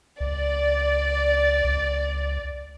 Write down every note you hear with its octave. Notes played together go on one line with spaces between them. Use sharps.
C#2 D5
C#2